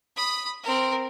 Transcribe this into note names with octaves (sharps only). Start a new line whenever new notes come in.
B5 D#6
C4 A#4